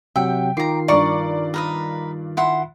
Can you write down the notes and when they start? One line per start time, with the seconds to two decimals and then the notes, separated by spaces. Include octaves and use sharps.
0.16 C3 F#3 E5 F#5 G5
0.57 D#3 F4 A#5 D6 C7
0.88 G2 A#4 D5 C#6
1.54 A#4 B4 D#5
2.37 E4 F#5 C6